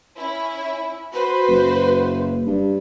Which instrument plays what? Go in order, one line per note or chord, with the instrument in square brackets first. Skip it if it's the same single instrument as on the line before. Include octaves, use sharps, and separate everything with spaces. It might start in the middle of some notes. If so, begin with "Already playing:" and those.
[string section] C#4 E4
F#4 B4 C5
[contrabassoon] F#1
G2